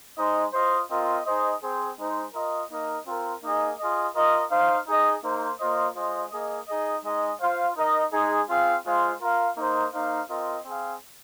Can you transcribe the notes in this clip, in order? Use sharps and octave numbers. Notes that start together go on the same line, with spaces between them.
G#3 D#4 C5 D#5
F4 C5 D#5
C4 F4 A#4 D#5
D#4 G#4 C5 D#5
C4 G#4 C5
G#3 D#4 C5
F4 A#4 D#5
A#3 D#4 A#4 D#5
C4 F4 A#4
A#3 D#4 G#4 D#5
F4 G#4 D#5
F4 A#4 D#5
D#4 C5 F5
D#4 G#4 D#5
A#3 D#4 C5
A#3 F4 C5 D#5
G#3 F4 C5 D#5
A#3 G#4 D#5
D#4 G#4 D#5
G#3 D#4 G#4 D#5
F4 C5 F5
D#4 A#4 D#5
G#3 D#4 G#4
C4 F4 G#4 F5
G#3 F4 C5 F5
F4 A#4 F5
A#3 D#4 C5 D#5
A#3 D#4 C5 F5
C4 F4 A#4 D#5
C4 G#4 F5